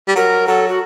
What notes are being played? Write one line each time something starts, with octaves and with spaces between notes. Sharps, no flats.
G3
F#3 A#4
F#3 A4
F#4